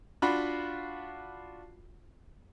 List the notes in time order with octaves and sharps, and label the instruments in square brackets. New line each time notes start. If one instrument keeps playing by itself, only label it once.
[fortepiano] D4 F4 F#4 B5